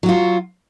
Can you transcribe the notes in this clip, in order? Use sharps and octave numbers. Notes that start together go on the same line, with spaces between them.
F#3 F4 F#4